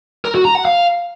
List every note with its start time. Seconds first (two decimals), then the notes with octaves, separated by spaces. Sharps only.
0.25 A#4
0.35 F#4
0.45 A#5
0.55 F#5
0.65 F5